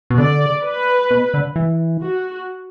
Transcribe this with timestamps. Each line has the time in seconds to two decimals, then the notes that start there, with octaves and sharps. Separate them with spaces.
0.10 B2
0.18 D3 D5
0.63 B4
1.11 B2
1.34 D3
1.56 E3
2.03 F#4